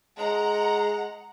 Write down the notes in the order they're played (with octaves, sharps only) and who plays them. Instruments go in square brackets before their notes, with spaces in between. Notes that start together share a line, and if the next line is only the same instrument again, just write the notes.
[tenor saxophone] G#3 [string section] F#5 A#5